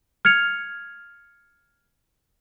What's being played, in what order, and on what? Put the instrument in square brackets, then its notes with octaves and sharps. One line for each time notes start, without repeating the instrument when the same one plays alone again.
[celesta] F6 G#6 C#7 F7